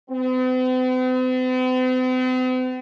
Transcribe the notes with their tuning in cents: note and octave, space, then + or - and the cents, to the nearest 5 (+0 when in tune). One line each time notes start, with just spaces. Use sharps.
C4 -45